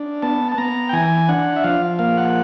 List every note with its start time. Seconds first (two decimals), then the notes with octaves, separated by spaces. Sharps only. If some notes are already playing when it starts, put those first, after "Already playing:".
Already playing: D4
0.22 B3 A5
0.52 A5
0.58 B3 A#5
0.89 G5
0.93 E3 G#5
1.29 D4 F#5
1.56 E5
1.64 F3 F5
1.99 A#3 F5
2.17 F#5